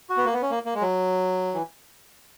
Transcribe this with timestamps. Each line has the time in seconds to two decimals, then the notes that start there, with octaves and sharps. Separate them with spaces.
0.10 F#4
0.17 B3
0.25 A#3
0.33 B3
0.42 C#4
0.51 A#3
0.66 A#3
0.74 G#3
0.82 F#3
1.54 E3